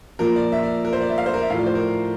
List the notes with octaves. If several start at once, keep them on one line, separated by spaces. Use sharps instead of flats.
A#2 F3 A#4
D5
E5
D5
A#4
C5
D5
E5
F5
C5
A#4
E5
A2 F3 D5 F5
C5
A#4